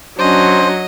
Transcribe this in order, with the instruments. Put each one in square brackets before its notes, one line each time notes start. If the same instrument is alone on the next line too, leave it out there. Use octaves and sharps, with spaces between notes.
[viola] F#3 [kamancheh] C#4 D4 [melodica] C5 [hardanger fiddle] D#5